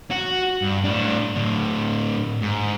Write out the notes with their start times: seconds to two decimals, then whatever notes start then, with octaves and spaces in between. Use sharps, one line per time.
0.11 F#4
0.62 G2
0.84 A2 D4
1.35 A2 D3
2.42 G#2